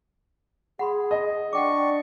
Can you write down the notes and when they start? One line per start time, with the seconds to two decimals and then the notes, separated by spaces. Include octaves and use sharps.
0.79 G#4 F#5 B5 C6
1.11 D#5
1.53 D4 D5 F#5 G5 C#6 D6